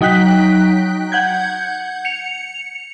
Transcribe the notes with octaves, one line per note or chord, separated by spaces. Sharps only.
F#3 D#4 G5 F#6 B6
F#5 G6 G#6
C#7 F7